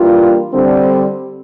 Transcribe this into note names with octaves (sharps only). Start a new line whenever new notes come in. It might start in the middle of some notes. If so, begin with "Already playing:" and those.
Already playing: E3 G3 A#3 D4 F4
D3 G3 C4